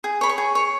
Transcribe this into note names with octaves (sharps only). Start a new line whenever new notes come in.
G#4
C#5 B5
C#6
G#4
C#5